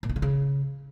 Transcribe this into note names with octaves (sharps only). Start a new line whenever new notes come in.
A#2
D#3
D3
C#3